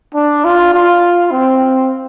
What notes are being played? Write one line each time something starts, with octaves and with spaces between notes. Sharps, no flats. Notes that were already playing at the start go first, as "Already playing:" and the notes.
D4
F4
F4
C4